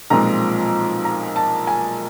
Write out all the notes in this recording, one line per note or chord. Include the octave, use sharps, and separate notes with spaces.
B1 A#2 F3 G#3 C4 A#5
A#5
A5
G#5